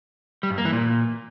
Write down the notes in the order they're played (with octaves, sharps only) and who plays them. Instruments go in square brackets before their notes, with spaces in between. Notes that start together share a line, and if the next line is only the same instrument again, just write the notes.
[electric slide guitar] G3
G2
A#3
E3
A#2